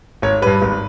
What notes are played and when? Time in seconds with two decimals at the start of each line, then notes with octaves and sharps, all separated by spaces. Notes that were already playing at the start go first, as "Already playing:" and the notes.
0.22 G#1 C#5
0.42 G2 G3 B4
0.62 G#1